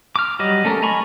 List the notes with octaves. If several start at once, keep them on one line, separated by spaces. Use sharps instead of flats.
D6 F6
F#3 G3 D#5
A3 C#4 A4 A#4
D#5 G#5 A#5 B5 C#6